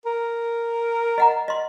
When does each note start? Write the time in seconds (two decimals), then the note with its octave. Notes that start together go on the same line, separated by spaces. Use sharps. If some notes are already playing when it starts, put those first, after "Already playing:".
0.06 A#4
1.18 D#5 F#5 A#5
1.48 D#5 C6